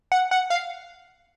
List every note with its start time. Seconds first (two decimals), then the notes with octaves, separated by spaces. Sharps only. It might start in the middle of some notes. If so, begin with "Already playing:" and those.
0.12 F#5
0.31 F#5
0.50 F5